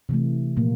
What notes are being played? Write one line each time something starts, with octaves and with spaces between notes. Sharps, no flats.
C3 E3 A3
A#2 F3 A#3